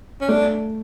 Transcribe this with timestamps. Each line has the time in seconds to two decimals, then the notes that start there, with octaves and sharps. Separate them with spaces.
0.21 C#4
0.29 A3 D4